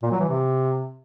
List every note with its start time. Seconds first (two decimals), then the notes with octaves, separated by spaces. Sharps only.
0.03 A#2
0.11 F#3
0.20 E3
0.29 C3